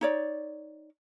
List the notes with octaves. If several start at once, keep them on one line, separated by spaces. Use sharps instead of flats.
D#4 C#5 D5